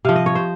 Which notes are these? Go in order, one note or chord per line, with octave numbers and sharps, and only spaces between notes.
C3 F3 F5
D#5
C#5
C5